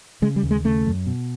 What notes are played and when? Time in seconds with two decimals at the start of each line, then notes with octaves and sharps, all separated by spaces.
0.22 C#3 G#3
0.36 G3
0.43 D#2
0.51 G#3
0.64 C#3 A3
0.86 F#2
1.06 B2